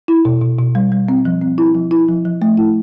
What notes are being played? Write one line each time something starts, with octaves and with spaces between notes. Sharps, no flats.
E4
B2
B2
B2
G3
G3
C4
F3
C4
E4
F3
E4
F3
F3
A3
E4